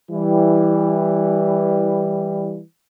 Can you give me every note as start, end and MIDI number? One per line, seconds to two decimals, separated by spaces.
0.11 2.60 52
0.11 2.60 55